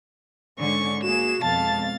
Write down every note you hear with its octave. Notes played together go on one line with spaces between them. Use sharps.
G#2 D3 C#4 C#6
A#3 F#4 G#4 E7
F2 B2 G#3 F5 A5 A6